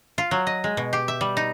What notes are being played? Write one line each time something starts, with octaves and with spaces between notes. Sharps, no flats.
F4
F#3
D#5
G#3
B2
G4
E5
G3
D#4